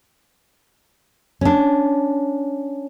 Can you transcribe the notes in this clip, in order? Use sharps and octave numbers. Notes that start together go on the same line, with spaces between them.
C#4 D4